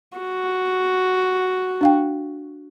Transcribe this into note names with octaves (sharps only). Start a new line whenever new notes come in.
F#4
D4 F5 G5